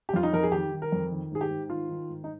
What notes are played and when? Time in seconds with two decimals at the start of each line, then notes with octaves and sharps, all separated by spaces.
0.09 G4
0.14 F2 F4
0.23 D#4
0.33 F2 A#4
0.43 G#4
0.52 D#3 G4
0.71 D#3
0.82 A#4
0.92 F2
1.11 D#3
1.32 G#2 G#4
1.41 G4
1.50 G#2
1.70 D#3 F4
1.89 D#3
2.09 G#2
2.24 D#4